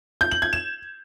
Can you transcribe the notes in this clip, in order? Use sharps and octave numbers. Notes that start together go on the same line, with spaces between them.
G6
F#7
G#6
E7